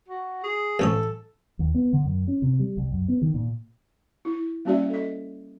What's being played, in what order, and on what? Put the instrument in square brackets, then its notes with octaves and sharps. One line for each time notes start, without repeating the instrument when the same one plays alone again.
[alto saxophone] F#4
G#4
[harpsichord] A1 C#4 D#6 [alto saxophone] A4
[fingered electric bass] D#2
B3
D3
F#2
C#4
C3
G3
C2
F#2
B3
D#3
A#2
[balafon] E4
G3 A#3 C#4 F#4 D5 E5
A4 D#5